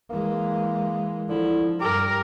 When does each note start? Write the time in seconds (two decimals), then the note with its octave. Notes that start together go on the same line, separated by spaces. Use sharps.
0.10 E3 G#3 A#3
1.29 D3 F3 E4
1.81 G2 G4 A#4 D6